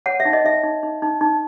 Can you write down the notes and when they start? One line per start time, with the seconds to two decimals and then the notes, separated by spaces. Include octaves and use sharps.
0.06 C#5 F#5
0.20 E5
0.25 D#4
0.33 D#5
0.44 D#4 E5
0.63 D#4
0.83 D#4
1.02 D#4
1.21 D#4